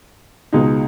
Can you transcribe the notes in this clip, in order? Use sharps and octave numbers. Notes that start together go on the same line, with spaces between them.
C#2 B2 G#3 D#4